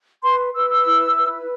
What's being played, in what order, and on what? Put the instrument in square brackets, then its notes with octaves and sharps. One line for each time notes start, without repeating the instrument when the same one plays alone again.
[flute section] B4 C6
B4 E6
E6
E4
B4